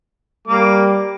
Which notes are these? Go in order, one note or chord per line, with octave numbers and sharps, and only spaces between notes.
G3 A#3 D6